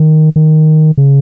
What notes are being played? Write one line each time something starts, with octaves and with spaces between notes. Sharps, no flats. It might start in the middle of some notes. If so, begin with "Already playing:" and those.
Already playing: D#3
D#3
C#3